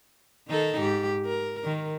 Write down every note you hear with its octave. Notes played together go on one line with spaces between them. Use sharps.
D#3 D#4 A4
G#2 G4
A#4
D#3